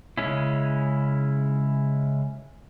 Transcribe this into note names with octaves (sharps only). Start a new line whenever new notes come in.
C#3 G#3 C#4 E4